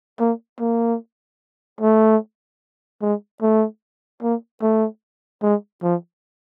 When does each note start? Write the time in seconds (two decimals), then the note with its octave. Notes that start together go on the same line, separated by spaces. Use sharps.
0.20 A#3
0.60 A#3
1.81 A3
3.02 G#3
3.42 A3
4.22 A#3
4.62 A3
5.42 G#3
5.83 F3